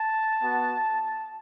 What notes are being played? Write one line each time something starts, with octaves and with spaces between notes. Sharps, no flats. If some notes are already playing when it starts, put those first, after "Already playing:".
Already playing: A5
B3 F#4